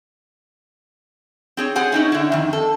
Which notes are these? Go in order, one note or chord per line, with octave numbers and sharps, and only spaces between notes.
C4 G#4 C#5
C4 G#4 C5 F#5 G#5
C#4 D#4 E4
D3 E4
F2 D#3
A4